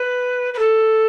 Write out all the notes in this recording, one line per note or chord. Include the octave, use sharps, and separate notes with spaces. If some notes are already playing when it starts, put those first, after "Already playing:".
Already playing: B4
B4
A4